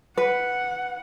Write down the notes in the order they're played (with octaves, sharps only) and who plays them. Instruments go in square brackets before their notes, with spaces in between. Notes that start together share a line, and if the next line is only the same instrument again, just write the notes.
[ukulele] B4 [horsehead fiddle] F#5